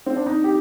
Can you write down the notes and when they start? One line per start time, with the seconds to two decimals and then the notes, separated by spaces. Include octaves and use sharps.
0.06 C4
0.17 D4
0.26 F2 D#4
0.44 G4